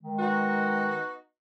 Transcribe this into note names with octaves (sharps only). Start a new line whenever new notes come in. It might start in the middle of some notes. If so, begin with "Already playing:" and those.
D#3 G#3
B3 D#4 F#4